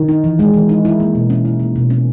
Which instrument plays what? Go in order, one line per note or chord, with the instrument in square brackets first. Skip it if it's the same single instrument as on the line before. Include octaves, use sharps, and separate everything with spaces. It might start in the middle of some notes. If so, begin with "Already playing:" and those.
Already playing: [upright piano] D#3
[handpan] D#4
E3
G#3
E3
D#4
E4
A#3
B2
C#4
E4
A#3
B2
C#4